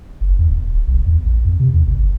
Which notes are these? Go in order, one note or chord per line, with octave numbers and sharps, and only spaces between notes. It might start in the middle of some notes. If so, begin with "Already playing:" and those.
F#1
E2
D#1
D1
B1
E2
A1
F2
C3
E2
G#1
G1